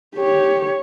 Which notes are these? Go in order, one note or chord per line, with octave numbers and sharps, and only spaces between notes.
G4 C#5